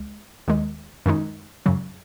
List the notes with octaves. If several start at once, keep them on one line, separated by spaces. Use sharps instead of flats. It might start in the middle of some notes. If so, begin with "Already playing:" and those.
Already playing: C#2 G#3
D#2 D#3 G#3
F#2 D#3 G#3 D#4
F#2 C#3 F#3